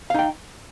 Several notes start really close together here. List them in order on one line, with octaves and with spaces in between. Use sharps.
F5 D#4 G5